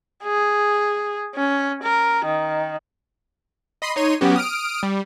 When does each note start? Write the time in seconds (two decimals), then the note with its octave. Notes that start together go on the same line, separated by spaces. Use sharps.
0.24 G#4
1.35 C#4
1.83 A#4
2.25 D#3
3.82 D#5 B5 C6 C7 D#7
3.96 D#4 C#5 C6 D#7
4.21 F#3 B3 C#4 F#4 G4
4.36 D#6 F6 D7
4.83 G3